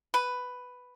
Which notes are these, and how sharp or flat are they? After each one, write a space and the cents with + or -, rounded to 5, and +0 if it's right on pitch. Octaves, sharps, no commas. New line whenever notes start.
B4 +5